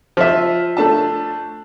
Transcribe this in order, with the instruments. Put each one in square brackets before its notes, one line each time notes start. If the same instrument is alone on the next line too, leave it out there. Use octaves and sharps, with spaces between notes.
[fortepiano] F3 E5 [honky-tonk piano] F4
[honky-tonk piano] A3 D4 A5